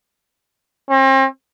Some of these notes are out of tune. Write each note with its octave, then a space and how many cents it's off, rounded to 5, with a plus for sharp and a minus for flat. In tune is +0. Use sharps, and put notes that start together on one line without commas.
C4 +40